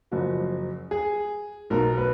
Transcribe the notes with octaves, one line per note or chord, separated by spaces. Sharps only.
F#1 F#2 F3 F#4
G#4
B1 B2 A#4
B4